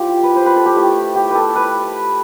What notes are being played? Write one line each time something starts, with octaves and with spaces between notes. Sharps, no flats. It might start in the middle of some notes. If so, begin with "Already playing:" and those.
Already playing: G3 C4 E4 F4 G4
B4
C5
B4
A4
G4
A3 E4
G4
A4 B4
B4